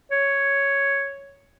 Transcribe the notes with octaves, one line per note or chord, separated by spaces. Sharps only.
C#5